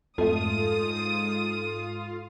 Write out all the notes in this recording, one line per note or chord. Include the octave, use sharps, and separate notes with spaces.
F2 G#2 A3 F4 A4 D#6